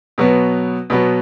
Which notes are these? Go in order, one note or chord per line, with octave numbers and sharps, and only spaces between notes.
B2 F#3 B3
B2 F#3 B3